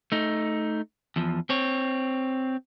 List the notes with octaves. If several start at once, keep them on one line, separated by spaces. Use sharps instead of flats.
A3 D#4
E2 F3
C4 C#5